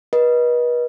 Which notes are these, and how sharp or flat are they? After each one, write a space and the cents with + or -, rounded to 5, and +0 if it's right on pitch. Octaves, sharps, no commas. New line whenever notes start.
B4 -35 D#5 +0